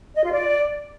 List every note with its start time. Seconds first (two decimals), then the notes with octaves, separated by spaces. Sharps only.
0.14 D#5
0.23 F4
0.31 D5